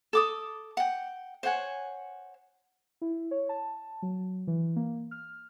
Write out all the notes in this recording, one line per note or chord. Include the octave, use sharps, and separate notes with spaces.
A4 D6 D#6
F#5 G5
C5 C#5 F#5 G#5
E4
C#5
A5
F#3
E3
A#3
F6